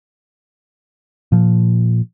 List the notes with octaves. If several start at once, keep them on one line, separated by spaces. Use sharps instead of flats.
A#2 F3